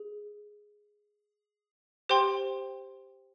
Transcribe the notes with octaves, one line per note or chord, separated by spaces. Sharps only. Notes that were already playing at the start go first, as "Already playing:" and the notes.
Already playing: G#4
G4 C5 G5 C6